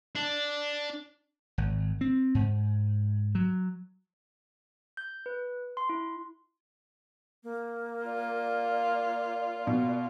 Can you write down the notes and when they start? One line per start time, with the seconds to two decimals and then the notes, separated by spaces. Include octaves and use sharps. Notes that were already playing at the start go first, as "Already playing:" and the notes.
0.15 D4
1.58 G#1
2.01 C4
2.35 G#2
3.35 F#3
4.97 G6
5.26 B4
5.77 C6
5.89 E4
7.43 A#3
8.06 F4 D5
9.67 B2